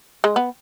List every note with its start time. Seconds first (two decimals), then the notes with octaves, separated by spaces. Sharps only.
0.24 G#3
0.36 B3